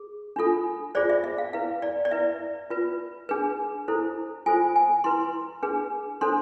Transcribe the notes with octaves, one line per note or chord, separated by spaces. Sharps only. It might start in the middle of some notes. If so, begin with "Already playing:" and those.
Already playing: G#4
D4 F4 A4
F4 G#4 C5 D5
E5
E5
F5
E4 B4 F5
D5
D5
E4 B4 E5
F4 B4
D4 G#4 B4
E4 A4 C5
F4 A4 C5 G#5
G#5
E4 B4 C6
D4 G#4 B4
D4 A4 C5 C6